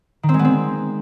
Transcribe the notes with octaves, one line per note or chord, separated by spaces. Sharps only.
D#3
C4
G#3
B3
C4